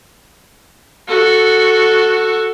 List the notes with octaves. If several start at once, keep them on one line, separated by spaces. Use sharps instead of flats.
F#4 A4